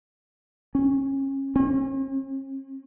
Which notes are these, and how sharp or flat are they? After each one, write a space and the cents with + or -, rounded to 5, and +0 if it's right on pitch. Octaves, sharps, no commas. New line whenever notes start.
C#4 -30
C#4 -45